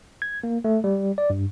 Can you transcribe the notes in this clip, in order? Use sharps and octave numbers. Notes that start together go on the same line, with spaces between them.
G#6
A#3
A3
G3
D5
G2